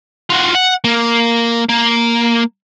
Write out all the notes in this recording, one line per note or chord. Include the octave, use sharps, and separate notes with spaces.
F4 F#4
F#5
A#3
A#3